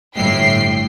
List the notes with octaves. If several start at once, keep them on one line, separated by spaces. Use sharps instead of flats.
G1 A2 G5 C7